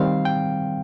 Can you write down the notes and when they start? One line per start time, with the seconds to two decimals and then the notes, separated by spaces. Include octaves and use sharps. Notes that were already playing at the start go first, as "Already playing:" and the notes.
Already playing: D#3 G3 C4 F5
0.25 G5